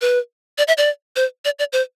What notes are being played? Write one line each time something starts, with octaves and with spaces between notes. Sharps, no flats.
B4
D5
E5
D5
C5
D5
D5
C5